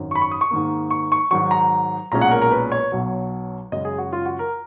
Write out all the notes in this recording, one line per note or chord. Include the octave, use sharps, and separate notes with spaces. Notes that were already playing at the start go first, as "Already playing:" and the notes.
Already playing: G#1 F#2 D#3
C#6
B5
C#6
D#6
C#6
G#2 D#3 A#3
C#6
C#6
G#2 D#3 F#3 C#6
A#5
B1 A#2 G#3 C#4 A#5
F#5
A#4
A#4
B4
C#5
B1 B2 F#3
F#2 C#3 G#3 D#5
G#4
F#4
F4
F#4
A#4